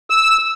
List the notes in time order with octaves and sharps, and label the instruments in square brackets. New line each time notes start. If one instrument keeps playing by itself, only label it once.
[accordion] E6